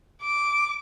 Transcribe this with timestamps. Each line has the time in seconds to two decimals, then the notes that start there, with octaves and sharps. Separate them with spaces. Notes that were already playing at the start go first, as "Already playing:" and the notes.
0.23 D6